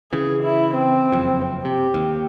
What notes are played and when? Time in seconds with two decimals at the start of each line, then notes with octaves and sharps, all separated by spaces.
0.13 C#3 E3 G#4
0.43 E4
0.75 C4
1.12 F#1 F2
1.65 C3 G4
1.94 D#2